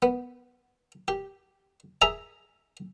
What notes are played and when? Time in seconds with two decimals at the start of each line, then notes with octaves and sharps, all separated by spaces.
0.02 B3
1.08 G4
2.02 G#4 E5 G#5 A#5